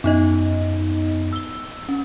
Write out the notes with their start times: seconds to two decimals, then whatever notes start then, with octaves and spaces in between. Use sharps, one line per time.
0.04 F#2 B3 D#4 D#5
1.33 E6 G7
1.89 C#4